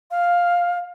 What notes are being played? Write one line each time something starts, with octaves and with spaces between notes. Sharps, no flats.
F5